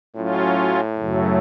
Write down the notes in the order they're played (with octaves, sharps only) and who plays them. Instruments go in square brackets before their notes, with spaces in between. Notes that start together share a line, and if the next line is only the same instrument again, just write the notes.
[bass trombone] A2 [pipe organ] F#3 C#4 F4
[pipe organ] F#2 C#3 F#3 A3